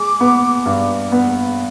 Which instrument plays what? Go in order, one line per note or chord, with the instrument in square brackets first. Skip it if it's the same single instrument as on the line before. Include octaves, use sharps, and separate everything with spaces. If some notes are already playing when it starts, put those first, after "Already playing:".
Already playing: [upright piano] G#3 [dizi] D6
[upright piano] B3
G2
B3